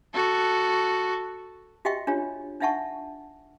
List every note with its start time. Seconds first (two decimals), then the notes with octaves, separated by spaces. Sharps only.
0.14 F#4 A4
1.85 F#4 G4 D#5 E5 G5 C#6
2.07 D4 F4 G4 C#5
2.61 D4 D#4 E5 F#5 A5 C#6